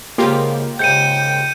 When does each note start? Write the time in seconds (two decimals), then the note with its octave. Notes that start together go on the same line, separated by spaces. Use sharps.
0.18 G#2 C#3 G#3 A#3 F4 G4
0.79 G#2 C#3 G5 G6 C#7 D#7